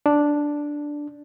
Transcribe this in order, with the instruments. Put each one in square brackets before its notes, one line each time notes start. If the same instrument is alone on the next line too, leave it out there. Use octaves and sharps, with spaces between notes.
[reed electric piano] D4